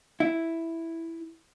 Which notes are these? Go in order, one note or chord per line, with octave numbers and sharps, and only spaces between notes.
E4